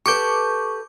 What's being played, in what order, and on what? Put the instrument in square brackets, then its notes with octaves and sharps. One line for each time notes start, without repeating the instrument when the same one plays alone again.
[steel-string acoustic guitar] G4 A4 B4 [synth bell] C#6 D6 G6